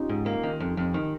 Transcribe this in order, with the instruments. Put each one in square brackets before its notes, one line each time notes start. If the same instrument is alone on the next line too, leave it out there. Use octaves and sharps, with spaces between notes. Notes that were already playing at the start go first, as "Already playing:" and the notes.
Already playing: [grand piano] C#4 D#4 F4 G4
[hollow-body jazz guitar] G#2
A#3
D#3
F2
F2
D#3